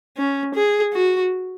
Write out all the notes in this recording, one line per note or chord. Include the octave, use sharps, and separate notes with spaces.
C#4
G#4
F#4